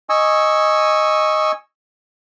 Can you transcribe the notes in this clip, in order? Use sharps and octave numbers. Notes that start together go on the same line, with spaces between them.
D#5 G#5 C#6 E6